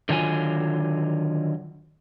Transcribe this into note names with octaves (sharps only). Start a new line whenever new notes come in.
D3 D#3 F#3 F4 G#5